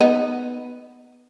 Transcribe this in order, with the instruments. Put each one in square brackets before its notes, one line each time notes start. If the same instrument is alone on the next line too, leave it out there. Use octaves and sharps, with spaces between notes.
[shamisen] B3 D#4